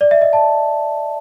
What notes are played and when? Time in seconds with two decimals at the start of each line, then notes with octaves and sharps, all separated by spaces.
0.01 D5
0.11 E5
0.22 D#5
0.33 A5